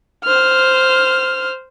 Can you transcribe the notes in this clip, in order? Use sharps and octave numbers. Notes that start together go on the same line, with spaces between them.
C5 F6